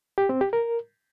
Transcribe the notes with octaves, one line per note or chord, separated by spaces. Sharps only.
G4
C4
G4
A#4